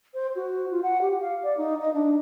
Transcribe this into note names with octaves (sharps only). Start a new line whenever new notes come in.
C5
F#4
F4
F#5
G4
F5
D5
D#4
D#5
D4